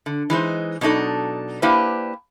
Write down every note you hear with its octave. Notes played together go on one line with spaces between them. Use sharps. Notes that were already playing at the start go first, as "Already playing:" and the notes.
D3
E3 G#3 D#4 C5
B2 F#3 D4 D#4 A4
A#3 D4 E4 G4 B4 C5